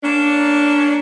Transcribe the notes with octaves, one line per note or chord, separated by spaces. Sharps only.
A#3 C#4 D4